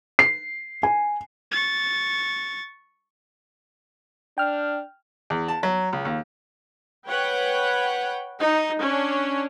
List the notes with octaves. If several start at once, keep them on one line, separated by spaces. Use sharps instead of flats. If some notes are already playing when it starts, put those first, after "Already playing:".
C7
G#5
C#6 A6
D4 G5 F6
E2
A5
F#3
C#2
D#2
B4 C#5 F#5 G5
D#4
C#4 D4 C#5